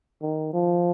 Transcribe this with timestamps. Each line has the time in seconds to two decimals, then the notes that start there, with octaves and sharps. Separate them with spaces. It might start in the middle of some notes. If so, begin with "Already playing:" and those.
0.22 D#3
0.54 F3